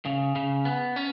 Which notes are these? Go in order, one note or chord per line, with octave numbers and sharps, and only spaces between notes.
C#3
C#3
B3
C#4